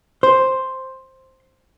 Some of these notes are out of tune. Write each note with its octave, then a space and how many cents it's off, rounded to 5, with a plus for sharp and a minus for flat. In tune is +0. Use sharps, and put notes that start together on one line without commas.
C5 +5